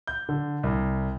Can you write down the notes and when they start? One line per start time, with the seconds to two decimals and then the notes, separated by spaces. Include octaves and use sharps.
0.07 G6
0.29 D3
0.63 C2